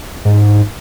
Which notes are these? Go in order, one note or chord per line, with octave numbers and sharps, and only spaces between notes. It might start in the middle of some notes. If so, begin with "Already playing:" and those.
G#2